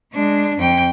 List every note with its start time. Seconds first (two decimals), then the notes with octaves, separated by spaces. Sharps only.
0.13 G#3 D4
0.58 F2 G5